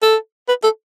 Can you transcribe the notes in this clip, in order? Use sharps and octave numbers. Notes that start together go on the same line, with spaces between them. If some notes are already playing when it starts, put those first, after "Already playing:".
A4
B4
A4